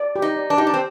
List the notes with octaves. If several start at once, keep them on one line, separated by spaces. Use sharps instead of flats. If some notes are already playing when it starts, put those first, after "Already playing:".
Already playing: D5
G4
D#4
D5
D4
D#4 G4
D4
C4